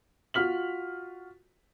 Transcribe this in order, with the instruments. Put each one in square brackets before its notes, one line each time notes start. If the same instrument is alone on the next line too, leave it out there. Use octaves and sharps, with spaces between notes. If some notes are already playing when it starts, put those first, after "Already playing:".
[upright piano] F4 F#4 F6 B6 F#7